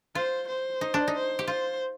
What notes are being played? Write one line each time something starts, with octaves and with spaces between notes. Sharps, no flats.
F4 C5
C5
D#4
D4
D#4
C5
G4
F4 C5